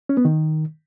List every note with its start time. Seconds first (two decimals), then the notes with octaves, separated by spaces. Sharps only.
0.09 C#4
0.17 B3
0.25 D#3